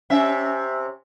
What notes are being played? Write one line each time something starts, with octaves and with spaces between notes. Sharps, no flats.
C3 C#4 E5